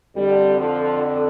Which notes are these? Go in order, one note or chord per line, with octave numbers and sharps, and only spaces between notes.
F2 D3 G3
F3